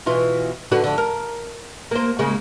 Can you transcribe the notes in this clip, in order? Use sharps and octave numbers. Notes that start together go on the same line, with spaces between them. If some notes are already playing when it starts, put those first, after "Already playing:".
B2 E3 F4
D3 F#4 B4
F2 D3
A#4
A#3 C5
C#3 G#3 A#3